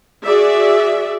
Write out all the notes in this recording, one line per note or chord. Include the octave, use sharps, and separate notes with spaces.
F#4 G#4 D5 E5